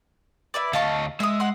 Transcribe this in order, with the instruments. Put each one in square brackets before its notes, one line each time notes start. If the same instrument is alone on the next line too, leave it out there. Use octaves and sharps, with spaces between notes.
[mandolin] E4 B4 D5
[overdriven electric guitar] D2 D#5 [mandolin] F5 A5 C#6
[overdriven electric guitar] G#3 [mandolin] E5 D#6
[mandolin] F#5 C6